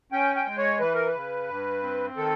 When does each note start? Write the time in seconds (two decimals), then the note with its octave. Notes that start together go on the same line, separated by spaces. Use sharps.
0.12 C#4 G5
0.36 G5
0.47 G#3
0.58 C#5
0.80 E3 B4
0.94 A#4
1.07 B4
1.15 C#3
1.49 G2
1.83 C4
2.16 D#3 A4